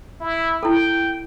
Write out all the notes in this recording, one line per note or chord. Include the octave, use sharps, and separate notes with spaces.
E4
E4 A4 G5